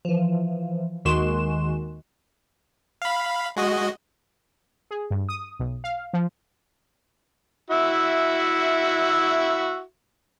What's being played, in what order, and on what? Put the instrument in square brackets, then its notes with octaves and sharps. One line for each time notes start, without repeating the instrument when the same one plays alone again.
[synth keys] E3 F3
D#2 D#3 G#3 F#4 C6 E7
[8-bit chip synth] F5 B5
G#3 F#4 D#5
[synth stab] G#4
G2
D#6
B1
F5
F3
[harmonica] E4 F#4 E5